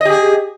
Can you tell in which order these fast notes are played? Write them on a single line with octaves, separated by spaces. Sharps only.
D#5 G4 G#4